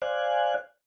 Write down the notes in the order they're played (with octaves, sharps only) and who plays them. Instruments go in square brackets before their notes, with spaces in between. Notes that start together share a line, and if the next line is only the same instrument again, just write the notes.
[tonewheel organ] C5 D5 F5 G#5 F#6